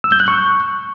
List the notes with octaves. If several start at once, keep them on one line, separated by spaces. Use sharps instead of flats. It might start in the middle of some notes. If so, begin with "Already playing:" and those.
E6
G6
F#6
C#6